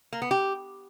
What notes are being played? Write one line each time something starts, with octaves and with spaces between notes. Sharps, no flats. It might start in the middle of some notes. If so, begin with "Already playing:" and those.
A#3
B3
G4